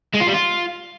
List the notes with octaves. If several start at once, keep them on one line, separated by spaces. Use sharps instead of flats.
G#3
F4
G3
F4